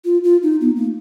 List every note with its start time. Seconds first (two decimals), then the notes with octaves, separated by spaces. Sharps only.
0.05 F4
0.24 F4
0.43 D#4
0.61 B3
0.76 A#3